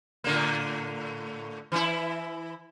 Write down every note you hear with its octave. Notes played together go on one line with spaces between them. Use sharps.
A2 D3 A#3
E3 E4